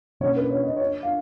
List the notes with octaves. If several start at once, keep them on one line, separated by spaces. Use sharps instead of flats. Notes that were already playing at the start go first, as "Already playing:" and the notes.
B2 A#3 C#4 C#5
B4
C#5
D#5
C#5
F5